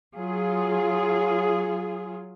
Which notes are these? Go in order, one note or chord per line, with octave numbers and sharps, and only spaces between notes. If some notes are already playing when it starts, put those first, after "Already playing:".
F#3 F4 G#4